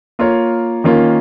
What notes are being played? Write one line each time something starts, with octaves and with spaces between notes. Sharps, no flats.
A#3 F4 A#4 C#5
D#3 A#3 C#4 F4